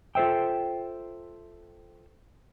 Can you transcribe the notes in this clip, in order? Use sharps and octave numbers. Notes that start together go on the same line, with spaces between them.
F4 A4 C5 E5 G5